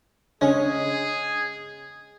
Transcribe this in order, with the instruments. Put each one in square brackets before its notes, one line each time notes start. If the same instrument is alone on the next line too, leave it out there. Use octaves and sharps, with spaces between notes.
[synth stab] C#3 C#4 [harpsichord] G#3 [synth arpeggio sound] D4 C#5 [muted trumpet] G#4